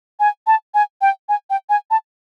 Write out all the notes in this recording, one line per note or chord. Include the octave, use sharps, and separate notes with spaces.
G#5
A5
G#5
G5
G#5
G5
G#5
A5